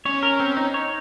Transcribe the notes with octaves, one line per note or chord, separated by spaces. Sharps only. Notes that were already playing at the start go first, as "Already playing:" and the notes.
C#4 C#5
A#4
C4
D#4
C#5